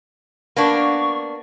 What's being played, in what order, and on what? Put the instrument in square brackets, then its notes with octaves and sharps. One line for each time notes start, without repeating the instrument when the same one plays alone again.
[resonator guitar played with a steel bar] A#3 B3 D4 [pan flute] C#6